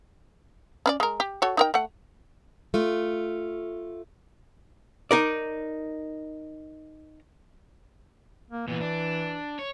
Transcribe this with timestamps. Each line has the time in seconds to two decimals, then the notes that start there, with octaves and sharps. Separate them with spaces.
0.86 C#4 B4 D5
1.00 G#3 A#4
1.20 G4
1.42 F#4 A4 C#5
1.57 D#4 A#4 G5
1.74 A3 F#5
2.74 A3 F4
5.11 D#4 A#4 D5
8.51 A#3
8.68 A#2 E3 B3
8.81 D4
9.59 C#5